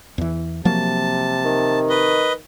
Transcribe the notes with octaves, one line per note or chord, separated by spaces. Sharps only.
E2 E3
C3 F3 F#3 A#3 A5
D#3
B4 D#5